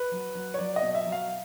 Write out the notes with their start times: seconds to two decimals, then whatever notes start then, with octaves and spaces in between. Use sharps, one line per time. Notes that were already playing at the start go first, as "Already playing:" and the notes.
Already playing: B4
0.12 F#3
0.35 F#3
0.54 C#5
0.58 F#3 D5
0.76 D#5
0.82 B2
0.95 E5
1.07 F#3
1.12 F5